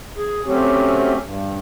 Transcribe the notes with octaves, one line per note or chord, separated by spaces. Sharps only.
G#4
F#3 A3 C4 C#4 G4
G2